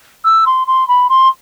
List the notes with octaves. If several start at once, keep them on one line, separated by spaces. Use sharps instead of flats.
E6
C6
C6
B5
C6